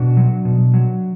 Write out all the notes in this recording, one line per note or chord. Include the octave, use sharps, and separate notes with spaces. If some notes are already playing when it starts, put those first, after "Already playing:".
Already playing: B2 D4 F#4
F#3
B2
F#3